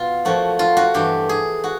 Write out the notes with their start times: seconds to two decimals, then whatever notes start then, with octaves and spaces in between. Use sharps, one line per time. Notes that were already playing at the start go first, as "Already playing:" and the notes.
Already playing: B2 F4
0.25 A#2 F3 A3 F#4
0.59 F4
0.77 F#4
0.94 G2 E3 A3 G4
1.29 G#4
1.64 F#4